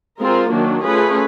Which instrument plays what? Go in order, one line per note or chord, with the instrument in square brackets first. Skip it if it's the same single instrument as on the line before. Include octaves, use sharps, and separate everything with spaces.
[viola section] G#3 C4 F4 A#4
D#3 F#3 A#3 D4
A3 C#4 F4 G#4 B4